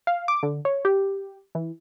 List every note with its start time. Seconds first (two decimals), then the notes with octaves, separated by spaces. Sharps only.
0.07 F5
0.28 D6
0.43 D3
0.65 C#5
0.85 G4
1.55 E3